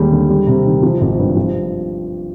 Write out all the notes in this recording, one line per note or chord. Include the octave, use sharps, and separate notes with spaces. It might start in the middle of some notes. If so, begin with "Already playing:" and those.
Already playing: D#2 G3 G#3
D3
G3
C3
D#3
F3
G#1
G2
F3